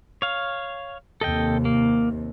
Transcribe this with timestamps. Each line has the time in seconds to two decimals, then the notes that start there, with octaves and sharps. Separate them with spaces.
0.22 C#5 F5
1.21 D#2 C3 A4 D#5 G5
1.65 A#3